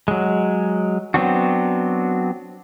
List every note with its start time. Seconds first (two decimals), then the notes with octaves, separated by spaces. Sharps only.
0.08 F#3 G#3
1.14 F#3 B3 C4 D4 F#4